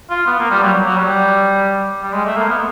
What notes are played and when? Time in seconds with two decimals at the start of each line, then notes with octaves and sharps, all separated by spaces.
0.10 F4
0.27 B3
0.39 A#3
0.51 G3
0.63 F#3
0.86 F#3
0.97 G3
2.03 G3
2.13 G#3
2.25 A3
2.37 A#3
2.49 B3